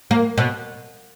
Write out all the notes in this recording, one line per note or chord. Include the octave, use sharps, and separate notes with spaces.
A#3
B2